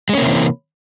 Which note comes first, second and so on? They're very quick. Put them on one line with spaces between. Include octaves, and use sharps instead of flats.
G#3 C#4 A#3 C3 E3